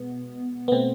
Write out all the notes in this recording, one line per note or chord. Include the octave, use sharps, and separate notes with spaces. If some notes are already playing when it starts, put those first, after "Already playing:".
Already playing: B2 G#3 B3
B3
B2 A3 C4